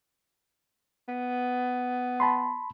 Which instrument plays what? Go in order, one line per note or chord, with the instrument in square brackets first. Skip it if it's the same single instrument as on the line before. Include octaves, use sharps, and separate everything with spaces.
[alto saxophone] B3
[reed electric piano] A5 B5 C6